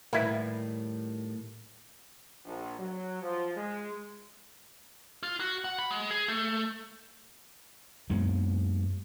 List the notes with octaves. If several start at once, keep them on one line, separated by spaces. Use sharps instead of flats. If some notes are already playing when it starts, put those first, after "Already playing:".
A2 D#3 G3 A#3 E4 B4
A#1
F#3
F3
G#3
F4
F#4
F#5
B5
G#3
G#4
A3
F#2 G#3 A#3 B3